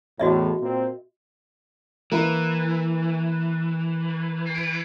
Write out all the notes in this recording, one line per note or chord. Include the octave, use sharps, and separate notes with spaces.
E2 A2 F#4 D#5 E5
A#2 A#3 C4
E3 A#3 E4 B4